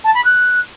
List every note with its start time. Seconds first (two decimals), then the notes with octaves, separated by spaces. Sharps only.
0.04 A5
0.14 B5
0.24 F#6